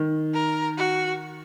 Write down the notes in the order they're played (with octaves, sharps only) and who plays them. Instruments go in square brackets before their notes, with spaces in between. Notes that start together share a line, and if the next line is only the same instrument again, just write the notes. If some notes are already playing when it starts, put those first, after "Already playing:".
Already playing: [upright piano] D#3
[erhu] A#4
F#4